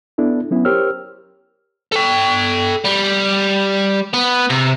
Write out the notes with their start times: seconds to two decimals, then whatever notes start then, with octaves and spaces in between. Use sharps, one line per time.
0.18 B3 D4 E4 A4
0.51 F#3 B3 C#4 E4
0.65 G4 A#4 C5 C#5 E6 F6
1.92 A4 G5
2.84 G3
4.13 B3
4.50 C3